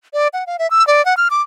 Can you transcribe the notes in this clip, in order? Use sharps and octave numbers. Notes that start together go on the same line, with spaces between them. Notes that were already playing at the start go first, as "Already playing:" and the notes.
D5
F#5
F5
E5
E6
D5
F#5
F6
D6